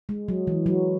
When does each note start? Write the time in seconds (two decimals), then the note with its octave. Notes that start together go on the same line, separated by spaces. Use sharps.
0.09 G#3
0.28 F#3
0.47 E3
0.66 F#3